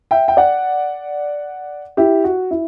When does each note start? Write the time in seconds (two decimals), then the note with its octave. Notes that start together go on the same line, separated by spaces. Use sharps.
0.11 E5 G5
0.28 G5
0.37 D5 F#5
1.97 E4 G4
2.24 F#4
2.51 E4